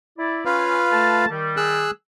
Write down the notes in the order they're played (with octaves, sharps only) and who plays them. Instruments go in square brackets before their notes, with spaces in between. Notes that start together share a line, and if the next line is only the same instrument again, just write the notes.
[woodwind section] E4 D5
[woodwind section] C#4 [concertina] F4 B4 F5
[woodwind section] A3 A5
D#3 G3
[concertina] G#4 E6 F#6